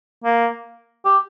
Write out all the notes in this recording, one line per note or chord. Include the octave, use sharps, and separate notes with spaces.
A#3
G4